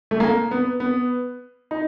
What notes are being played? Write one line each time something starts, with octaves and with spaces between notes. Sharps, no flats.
A3
A#3
B3
B3
D#4